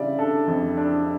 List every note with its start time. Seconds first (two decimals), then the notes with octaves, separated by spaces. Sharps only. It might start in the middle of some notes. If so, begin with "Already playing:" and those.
Already playing: C#3 G3 D5 E5
0.19 D4 A4
0.47 F2
0.77 D4